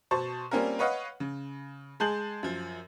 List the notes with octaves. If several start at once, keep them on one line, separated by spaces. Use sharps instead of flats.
B2 C5 A5 C#6
G3 A#3 C4 C#4 F4 A#4
B4 C#5 D#5 F5 F#5
C#3
G#3 G#4 A5 G6 F#7
F#2 F3